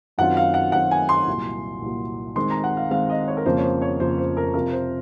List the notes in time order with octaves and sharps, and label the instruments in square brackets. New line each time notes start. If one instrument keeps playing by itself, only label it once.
[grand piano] F#2 D#3 F#3 C4 F4 [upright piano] F#5
[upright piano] F5
F#5
[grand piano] F#2 D#3 F#3 C4 F4 [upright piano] F#5
[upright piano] G#5
C6
[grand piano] C2 A#2 F#3
C2 A#2 F#3
[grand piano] D#3 G#3 C4 [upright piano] C6
[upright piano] A#5
F#5
F5
[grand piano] D#3 G#3 C4 [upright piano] F5
[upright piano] D#5
C#5
A#4
[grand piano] F2 C#3 F3 A#3 [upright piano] C5
[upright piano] C#5
C5
C#5
[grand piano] F2 C#3 F3 A#3 [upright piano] C5
[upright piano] C5
A#4
[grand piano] C3 F3 C4 F4 [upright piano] A#4
[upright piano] C5